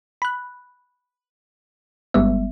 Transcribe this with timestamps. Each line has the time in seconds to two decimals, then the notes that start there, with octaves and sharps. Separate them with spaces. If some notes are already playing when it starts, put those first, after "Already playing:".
0.22 B5 F#6
2.14 G1 G3 G#3 B3 E5